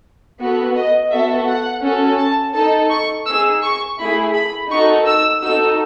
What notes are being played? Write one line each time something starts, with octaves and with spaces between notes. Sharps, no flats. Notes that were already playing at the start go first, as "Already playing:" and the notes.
B3 F#4 A4
D#5
B3 F#4 A4 E5
F#5
C#4 F#4 A4
A5
D#4 A4 A5
C#6
D#4 G#4 E6
C#6
A3 E4 G#4 B5
B5
D#4 F#4 A4 C#6
E6
D#4 F#4 A4 E6